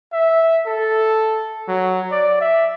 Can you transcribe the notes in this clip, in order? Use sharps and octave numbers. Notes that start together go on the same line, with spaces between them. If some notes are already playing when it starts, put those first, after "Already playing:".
E5
A4
F#3
D5
E5